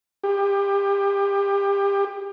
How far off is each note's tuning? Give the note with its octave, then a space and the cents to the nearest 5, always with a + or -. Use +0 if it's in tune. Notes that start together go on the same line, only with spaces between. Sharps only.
G4 +25